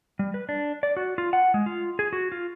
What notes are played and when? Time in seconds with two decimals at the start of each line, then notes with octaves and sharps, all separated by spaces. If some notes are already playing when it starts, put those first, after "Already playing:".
0.19 G3
0.34 B4
0.49 D4
0.83 D5
0.97 F#4
1.18 F4
1.33 F#5
1.54 G#3
1.66 F4
1.99 G#4
2.13 F#4
2.32 F4